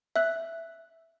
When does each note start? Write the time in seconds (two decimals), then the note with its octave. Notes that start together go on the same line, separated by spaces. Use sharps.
0.16 E5 F#6